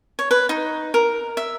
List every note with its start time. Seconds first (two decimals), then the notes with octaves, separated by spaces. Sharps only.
0.19 C#5
0.31 B4
0.49 D#4
0.94 A#4
1.37 E5